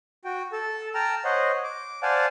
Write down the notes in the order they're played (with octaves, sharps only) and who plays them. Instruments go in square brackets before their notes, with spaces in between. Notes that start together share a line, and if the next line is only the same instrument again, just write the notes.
[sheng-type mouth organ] F#4 G5
A4 A5
G5 A5 A#5 F6
C5 C#5 D#5 F#5
D6
C5 D5 F5 F#5 G#5 A5